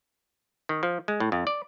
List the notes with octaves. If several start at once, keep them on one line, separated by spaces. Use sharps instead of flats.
D#3
F3
G#3
A2
F2
D5